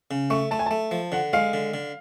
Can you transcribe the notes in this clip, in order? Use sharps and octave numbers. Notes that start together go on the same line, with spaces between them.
C#3
A3 C#6
A3 A5
G#5
A3 A5
F3
D3 F#5
G#3 F5
D3
D3